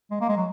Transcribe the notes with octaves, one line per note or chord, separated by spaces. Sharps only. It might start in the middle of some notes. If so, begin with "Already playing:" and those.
G#3
A#3
G#3
F#3